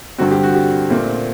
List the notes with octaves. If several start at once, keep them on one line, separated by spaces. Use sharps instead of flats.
G2 D3 G3 C4 F#4
G4
F#4
G4
A#2 A3 C4